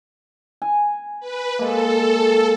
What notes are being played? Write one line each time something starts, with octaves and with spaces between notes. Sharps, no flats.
G#5
B4
G#3 A#3 A4